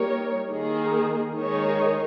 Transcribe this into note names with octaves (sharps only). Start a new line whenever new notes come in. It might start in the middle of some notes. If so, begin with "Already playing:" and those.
Already playing: G3 A#3 D#4 A#4 C#5
D#3 A#3 D#4 G#4
D#3 G#3 D#4 G#4 C#5